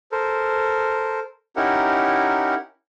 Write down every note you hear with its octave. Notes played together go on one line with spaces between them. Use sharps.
A4 A#4 C5
C#4 D#4 E4 G4 A#4 F#5